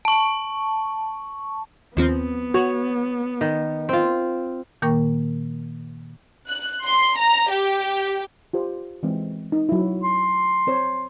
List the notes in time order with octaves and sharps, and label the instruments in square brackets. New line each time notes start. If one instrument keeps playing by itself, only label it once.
[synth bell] A5 C#6
[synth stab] D#2 F3 C4 [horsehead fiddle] B3
[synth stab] F#4 [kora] C#5
[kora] D#3
C4 F4
[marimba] A#2 D#3 A#3 A#4 G5 C#6
[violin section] F#6
C6
A#5
G4
[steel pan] F4 G4 C5
E3 G#3 C4
D#4
F#3 E4
[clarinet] C6
[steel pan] C4 C5 C#5